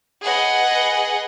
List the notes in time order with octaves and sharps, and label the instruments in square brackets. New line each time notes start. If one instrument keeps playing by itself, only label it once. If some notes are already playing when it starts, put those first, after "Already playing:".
[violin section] G#4 B4 D#5 F#5